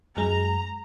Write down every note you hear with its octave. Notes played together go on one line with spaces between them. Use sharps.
F#2 G#3 A#5